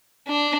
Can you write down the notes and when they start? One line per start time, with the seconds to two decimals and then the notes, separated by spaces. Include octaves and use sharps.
0.28 D4